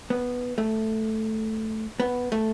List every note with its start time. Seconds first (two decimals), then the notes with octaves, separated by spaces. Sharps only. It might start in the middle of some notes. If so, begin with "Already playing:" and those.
0.10 B3
0.58 A3
2.00 B3
2.32 A3